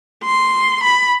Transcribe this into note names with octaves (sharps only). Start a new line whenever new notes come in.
C6
B5